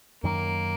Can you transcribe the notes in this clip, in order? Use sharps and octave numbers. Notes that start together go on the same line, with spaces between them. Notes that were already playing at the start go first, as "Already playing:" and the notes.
F#2 D#3 F#3 A#3